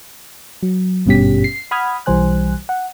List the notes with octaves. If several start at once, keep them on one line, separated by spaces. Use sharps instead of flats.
F#3
G#1 G2 B2 C#4 G4 B6
C7
F#5 B5 D#6 F6 G#6
B1 E3 G3 C5 G#5 F#6
F#5